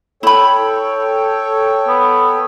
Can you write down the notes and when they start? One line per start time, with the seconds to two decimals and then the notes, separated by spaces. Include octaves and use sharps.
0.23 E4 A4 C#5 G5 B5
1.88 B3